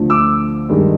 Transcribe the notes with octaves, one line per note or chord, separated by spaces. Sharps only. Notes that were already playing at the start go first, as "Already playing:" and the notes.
Already playing: D2 D3 F3 A3
D6 E6
G2 D#3 G#3